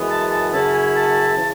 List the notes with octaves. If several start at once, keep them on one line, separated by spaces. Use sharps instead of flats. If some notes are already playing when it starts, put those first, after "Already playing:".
Already playing: F#2 E3 G#3 B3
A5
A5
F#2 C#3 F#3 C#4 E4 A5
G#5
A5
C#3 E3